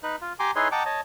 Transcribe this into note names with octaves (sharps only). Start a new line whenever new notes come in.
D#4 B4 F#6
F4
G4 G#5 A#5 C6 D6
D#4 E4 G#4 B4 C#5 C6
D#5 F#5 G5 A5 A#5 D6
C#5 D#5 A5